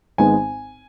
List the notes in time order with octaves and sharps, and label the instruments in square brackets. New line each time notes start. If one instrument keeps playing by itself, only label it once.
[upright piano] G#1 G#2 G#3 B3 G#5